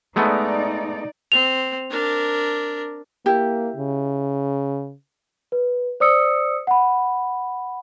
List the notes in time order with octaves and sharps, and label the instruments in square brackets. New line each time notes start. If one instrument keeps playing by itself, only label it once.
[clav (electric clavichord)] G#3 A3 B3 [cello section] D#4 D5
[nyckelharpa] C4 [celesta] F7
[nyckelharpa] D4 A#4
[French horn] A#3 [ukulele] E4 G4
[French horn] C#3
[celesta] B4
C5 D5 D#6 E6 C#7
F#5 B5